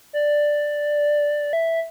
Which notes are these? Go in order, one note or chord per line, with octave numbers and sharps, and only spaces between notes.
D5
E5